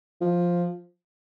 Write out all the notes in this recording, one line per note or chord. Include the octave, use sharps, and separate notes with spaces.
F3